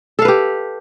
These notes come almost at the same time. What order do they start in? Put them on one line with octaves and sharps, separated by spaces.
A4 F5 B4 G4